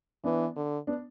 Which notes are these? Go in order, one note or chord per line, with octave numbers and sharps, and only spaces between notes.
E3 B3 D4
D3
B3 D4